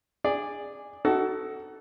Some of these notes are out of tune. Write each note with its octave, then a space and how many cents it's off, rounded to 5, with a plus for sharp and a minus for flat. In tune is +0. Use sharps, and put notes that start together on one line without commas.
G#4 -20 D5 +0
D#4 +10 F#4 +25 A4 +0